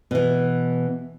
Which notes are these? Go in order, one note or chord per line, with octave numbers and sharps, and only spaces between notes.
B2 E3